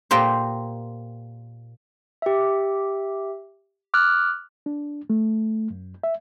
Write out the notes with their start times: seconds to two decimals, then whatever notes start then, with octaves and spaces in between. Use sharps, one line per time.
0.11 A#2 A#3 G4 C5
2.22 G4 E5
3.94 D6 F6 F#6
4.66 D4
5.10 A3
5.70 F#2
6.04 E5